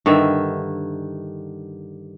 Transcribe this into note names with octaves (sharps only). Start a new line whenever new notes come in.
G2 D3 D#3 E5